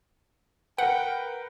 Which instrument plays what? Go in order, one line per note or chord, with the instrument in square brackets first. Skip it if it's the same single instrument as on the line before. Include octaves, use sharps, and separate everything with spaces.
[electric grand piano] A#4 B4 [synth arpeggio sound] F#5 [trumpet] G5